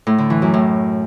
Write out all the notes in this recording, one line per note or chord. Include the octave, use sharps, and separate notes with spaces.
A2
D3
E3
F#2
A2